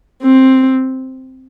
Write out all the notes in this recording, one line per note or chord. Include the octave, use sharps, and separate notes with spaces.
C4